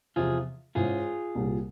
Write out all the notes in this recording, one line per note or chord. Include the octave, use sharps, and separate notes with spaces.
E2 C3 F3 F4 G#4
G#2 E3 G#3 C#4 F4 G#4
C2 A#2 G3